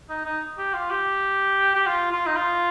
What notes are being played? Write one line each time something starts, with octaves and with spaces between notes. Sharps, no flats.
D#4
D#4
G4
F4
G4
G4
F4
F4
D#4
F4